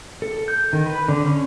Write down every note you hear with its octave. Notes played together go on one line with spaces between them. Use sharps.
A4
G6
D#3
B4
D3
C#4